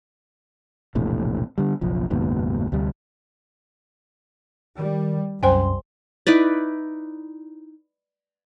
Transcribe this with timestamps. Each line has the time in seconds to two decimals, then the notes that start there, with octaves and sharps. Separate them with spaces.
0.95 E1 A#1 A2 C3
1.58 D3 G3
1.81 F#1 B1 F3
2.10 F#1 D#2 G#2 B2
2.72 D2 C3 G3
4.77 D#3 G3
5.43 C2 F#2 C5 G5 G#5 C6
6.27 D#4 E4 B4 D5